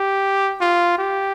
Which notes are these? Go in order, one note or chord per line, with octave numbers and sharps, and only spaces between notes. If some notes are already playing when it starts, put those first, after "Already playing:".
Already playing: G4
F4
G4